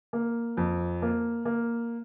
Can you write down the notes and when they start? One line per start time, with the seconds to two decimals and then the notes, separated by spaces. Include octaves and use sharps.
0.13 A#3
0.57 F2
1.02 A#3
1.45 A#3